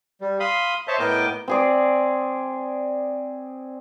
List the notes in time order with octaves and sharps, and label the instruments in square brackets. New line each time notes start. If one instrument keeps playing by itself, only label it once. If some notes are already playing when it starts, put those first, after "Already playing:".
[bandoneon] G3
F5 B5 C6 D#6
C5 C#5 D#5 E5 A5
A2 B3 A#4 D#5 G5 D6
[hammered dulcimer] C4 G#4 D5